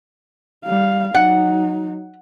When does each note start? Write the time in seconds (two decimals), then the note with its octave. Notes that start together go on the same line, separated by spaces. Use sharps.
0.65 G3 F5
1.15 F#3 D#4 F#5